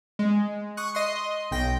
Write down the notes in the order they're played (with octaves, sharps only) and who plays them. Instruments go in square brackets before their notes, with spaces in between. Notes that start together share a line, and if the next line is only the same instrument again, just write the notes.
[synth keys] G#3
C#6 D#6 F#6
D#5 C6
B1 G5 A#6